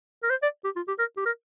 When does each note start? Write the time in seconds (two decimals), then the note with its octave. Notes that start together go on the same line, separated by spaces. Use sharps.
0.23 A#4
0.30 C5
0.43 D5
0.64 G4
0.76 F4
0.88 G4
0.99 A#4
1.17 G4
1.26 A#4